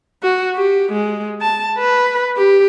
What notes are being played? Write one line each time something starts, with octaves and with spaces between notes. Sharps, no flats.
F#4
G4
G#3
A5
B4
G4